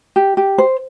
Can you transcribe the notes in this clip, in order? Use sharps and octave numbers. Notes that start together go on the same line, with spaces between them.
G4
G4
C5